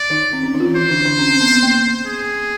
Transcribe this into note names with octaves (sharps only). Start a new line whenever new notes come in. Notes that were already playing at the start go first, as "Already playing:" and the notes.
Already playing: D5
D#3 D#4
C4
C#4
D#3 D#4
F4
E3 E4
E3 E4 C5
D3 D4
D3 D4
C#4
C4
B3
B3
A#3
G#4